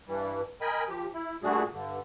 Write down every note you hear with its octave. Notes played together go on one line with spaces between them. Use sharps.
G2 E3 G3
A#4 D#5 G5 G#5 B5
F3 G4
E4
A#2 G3 A3 D4 F#4 G#4
G2 D3